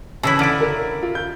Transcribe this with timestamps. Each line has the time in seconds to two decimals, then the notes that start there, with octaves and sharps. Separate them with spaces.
0.23 C#3 E3 E4 A5 E6
0.39 D3 E4 F6 A6 D7
0.60 A#4
1.03 F4
1.15 G6